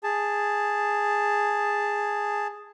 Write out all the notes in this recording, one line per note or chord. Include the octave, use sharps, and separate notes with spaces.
G#4 A5